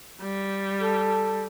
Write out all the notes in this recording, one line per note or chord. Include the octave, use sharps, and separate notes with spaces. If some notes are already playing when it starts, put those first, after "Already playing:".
G3
A4